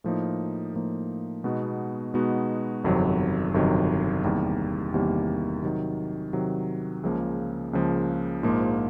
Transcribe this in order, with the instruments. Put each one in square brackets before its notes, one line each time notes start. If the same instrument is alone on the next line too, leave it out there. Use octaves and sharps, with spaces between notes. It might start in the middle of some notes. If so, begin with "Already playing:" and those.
[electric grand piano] A2 F3 A#3 D#4
A2 F3 A#3 D#4
B2 G#3 B3 D#4 F#4
B2 G#3 B3 D#4 F#4
G1 F2 C3 D#3 F#3
G1 F2 C3 D#3 F#3
E2 C3 D#3 G3 A#3
E2 C3 D#3 G3 A#3
C3 D#3 F#3
C3 D#3 F#3
C#2 C#3 F3 A#3
C#2 C#3 F3 A#3
A#1 G#2 F3 A#3